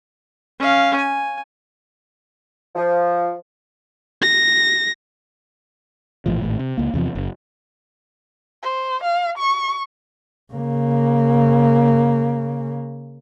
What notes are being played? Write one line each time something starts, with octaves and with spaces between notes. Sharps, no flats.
C#4 F5
G#5
F3
A#6
A#1 A2 E3 F3
G#1 A2
C3
C#2 A#3
E2 C3 E3 F3
F#1
C5
F5
C#6
C#3 A#3